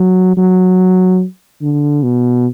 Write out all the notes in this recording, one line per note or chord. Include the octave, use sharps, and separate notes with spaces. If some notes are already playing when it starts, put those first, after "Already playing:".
Already playing: F#3
F#3
D3
B2